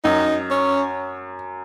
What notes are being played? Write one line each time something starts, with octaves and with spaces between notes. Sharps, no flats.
F#2 D#4
C#4